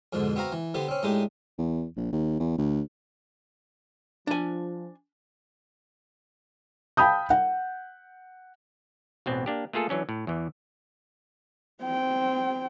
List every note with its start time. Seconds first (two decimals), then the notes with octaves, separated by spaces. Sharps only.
0.13 F2 G#2 B2 D3
0.36 B3 C4 F#4 F5 A#5
0.52 E3
0.74 D3 B3 G4 C5
0.88 C4 C#4
1.03 A2 G#3 D4 D#4 G4
1.59 E2
1.97 A#1
2.13 D#2
2.40 E2
2.58 D2
4.27 F3 D4 G#5
6.97 F5 G5 A5 B5 D#6 G6
7.30 F#5
9.26 A1 E2 B2 B3 C4
9.46 A#3 D4 G4
9.73 A3 A#3 F4 G#4 A4
9.89 E3 F#3 C#4 D4
10.09 A2
10.27 E2 E3
11.84 C4 G5